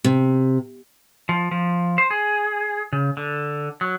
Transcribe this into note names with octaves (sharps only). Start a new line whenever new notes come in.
C3
F3
F3
C5
G#4
C#3
D3
F#3